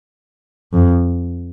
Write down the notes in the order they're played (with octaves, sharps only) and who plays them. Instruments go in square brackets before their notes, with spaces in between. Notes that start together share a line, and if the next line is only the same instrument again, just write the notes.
[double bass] F2